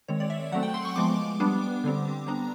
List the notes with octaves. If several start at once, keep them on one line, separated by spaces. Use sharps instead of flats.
D#3 G#3 C4 C#5
D5
E5
F#3 A3 C4 F#5
G5
C6
C#6
F3 G#3 B3 D6
G3 B3 D4
D3 G3 C4
G3 B3 D4 A#5